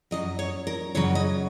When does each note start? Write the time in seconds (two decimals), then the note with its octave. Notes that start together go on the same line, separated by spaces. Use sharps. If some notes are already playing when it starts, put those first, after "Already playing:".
0.11 F#2 C#3 F#3 D#5
0.39 C#5
0.67 A#4
0.95 F#2 C#3 F#3 C#5
1.15 D#5